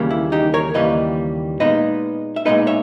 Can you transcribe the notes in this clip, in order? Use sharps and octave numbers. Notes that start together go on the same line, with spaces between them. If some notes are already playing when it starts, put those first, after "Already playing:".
Already playing: D#2 C#3 E3 G3 A#3
E4
D#4 G4
A#4 C#5
D#2 C#3 E3 G3 A#3 B4 D#5
A#2 G#3 B3 D#4 B4 D#5
E5
A#2 G#3 B3 D#4 B4 D#5
C#5 E5